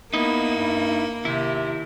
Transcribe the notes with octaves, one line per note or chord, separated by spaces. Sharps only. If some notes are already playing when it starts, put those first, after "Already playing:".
A#3 B3 D#4 E4
G2
D#2 C3 E4